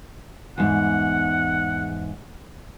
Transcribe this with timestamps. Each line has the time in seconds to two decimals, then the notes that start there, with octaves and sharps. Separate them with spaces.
0.58 E2 G#2 F#5